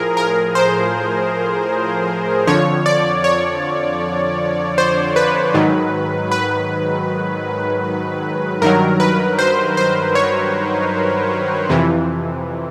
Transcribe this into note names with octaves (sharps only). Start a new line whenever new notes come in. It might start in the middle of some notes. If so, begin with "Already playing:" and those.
Already playing: A2 F3 G#4 A#4
A#4
C5
F2 D3 F3 C#5
D5
C#5
C5
B4
G#2 D#3 F#3
B4
G2 D#3 F#3 A#4
B4
C5
C5
C#5
F2 C3 E3